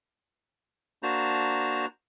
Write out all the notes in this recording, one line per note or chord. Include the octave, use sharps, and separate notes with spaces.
A#3 D4 F#4 C5 A5 A#5